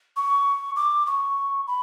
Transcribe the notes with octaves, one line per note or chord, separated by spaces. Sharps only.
C#6
D6
C#6
B5